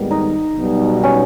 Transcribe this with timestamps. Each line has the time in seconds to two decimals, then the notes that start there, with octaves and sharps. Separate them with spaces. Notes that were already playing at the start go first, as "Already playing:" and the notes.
Already playing: G#1 G#2 D#3 G3 B3
0.11 D#4
0.57 B1 B2 G3
1.03 C#4